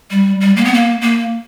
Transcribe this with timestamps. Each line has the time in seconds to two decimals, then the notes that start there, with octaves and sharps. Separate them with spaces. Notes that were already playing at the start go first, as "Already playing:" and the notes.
0.11 G3
0.41 G3
0.57 A#3
0.65 B3
0.74 A#3
1.02 A#3